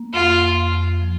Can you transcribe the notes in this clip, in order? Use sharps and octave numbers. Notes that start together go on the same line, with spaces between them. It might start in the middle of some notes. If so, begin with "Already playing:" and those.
Already playing: A#3
F2 F4
F2
F2
F3